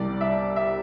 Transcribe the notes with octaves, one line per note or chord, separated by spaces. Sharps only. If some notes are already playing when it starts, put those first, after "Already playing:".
Already playing: C2 C3 G3 D5
E5
E5